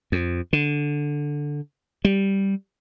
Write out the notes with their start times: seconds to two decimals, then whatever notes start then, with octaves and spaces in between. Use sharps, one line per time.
0.12 F2
0.53 D3
2.05 G3